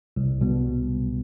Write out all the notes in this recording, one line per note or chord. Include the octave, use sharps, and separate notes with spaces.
C2
B2 G3 B3